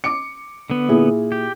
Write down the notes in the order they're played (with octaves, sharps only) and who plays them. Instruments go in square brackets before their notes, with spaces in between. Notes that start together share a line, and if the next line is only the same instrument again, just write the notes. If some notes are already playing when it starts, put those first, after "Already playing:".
[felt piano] D6 C#7
[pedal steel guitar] D3 B3
[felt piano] A#2 E4 G#4
[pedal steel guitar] G4